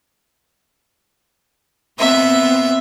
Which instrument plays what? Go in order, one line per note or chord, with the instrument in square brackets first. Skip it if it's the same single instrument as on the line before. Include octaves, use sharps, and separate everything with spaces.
[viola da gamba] B3 C4 [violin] E5